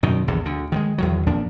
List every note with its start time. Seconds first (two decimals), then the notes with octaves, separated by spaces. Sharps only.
0.03 F#2 B2 D#3
0.28 A#1 E2 G2 D3
0.45 D2 D3
0.72 D#3 E3 G#3
0.98 E2 D#3 F#3
1.27 F2 A#2 F3 D4